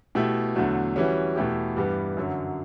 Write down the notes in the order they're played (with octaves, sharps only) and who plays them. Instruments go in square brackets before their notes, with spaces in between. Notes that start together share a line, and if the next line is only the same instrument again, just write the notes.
[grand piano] B2 A3 E4 G4
E2 D3 F#3 A3
E3 G3 C#4 F#4
E2 B2 A3 E4 G4
G2 E3 G3 B3
F#2 D3 F#3